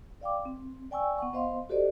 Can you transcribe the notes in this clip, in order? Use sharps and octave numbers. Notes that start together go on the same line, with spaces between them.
D5 F5 G5 D6
C4
D5 G5 G#5 C#6 E6
B3 F#5 C#6
B3 C5 D#5 F5 C6
F#4 G4 A4 C5 D5 D#5